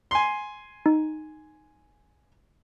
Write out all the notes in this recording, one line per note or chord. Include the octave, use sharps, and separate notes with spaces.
G#5 C6
D#4